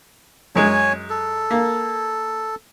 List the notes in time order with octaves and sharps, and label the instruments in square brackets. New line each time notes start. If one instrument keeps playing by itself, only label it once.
[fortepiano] F#2 G#3 [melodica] C#5 G#5
[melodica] A4
[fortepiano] A#3